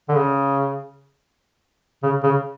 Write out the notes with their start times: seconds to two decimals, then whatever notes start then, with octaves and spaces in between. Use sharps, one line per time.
0.09 D3
0.15 C#3
2.03 C#3
2.23 C#3